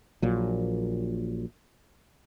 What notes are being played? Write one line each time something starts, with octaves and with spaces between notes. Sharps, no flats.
A#1 A#2 F#3